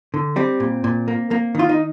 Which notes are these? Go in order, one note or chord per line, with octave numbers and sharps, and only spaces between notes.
D3
G3 C4
A#2
A#2
A#3
A#3
D#3 F4
D#4